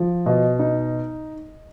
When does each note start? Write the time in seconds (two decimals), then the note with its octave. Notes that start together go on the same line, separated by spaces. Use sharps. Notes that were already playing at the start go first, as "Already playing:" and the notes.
Already playing: F3
0.26 B2 D#5
0.59 D#4